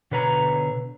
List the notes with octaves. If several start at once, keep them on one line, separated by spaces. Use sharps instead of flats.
B2 D3 B4 C#5 A#5